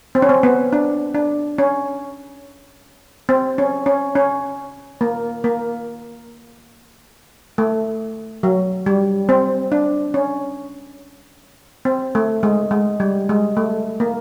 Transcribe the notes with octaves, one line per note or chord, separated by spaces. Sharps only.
C4
C#4
C4
B3
D4
D4
C#4
C4
C#4
C#4
C#4
A#3
A#3
A3
F#3
G3
C4
D4
C#4
C4
A3
G#3
G#3
G3
G#3
A3
A#3